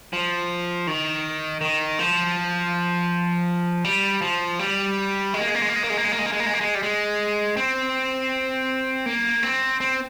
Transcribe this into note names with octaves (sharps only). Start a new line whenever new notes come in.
F3
D#3
D#3
F3
G3
F3
G3
G#3
A#3
G#3
A#3
G#3
A#3
G#3
A#3
G#3
A#3
G#3
A#3
G#3
A#3
G#3
A#3
G#3
A#3
G#3
G3
G#3
C4
A#3
C4
C4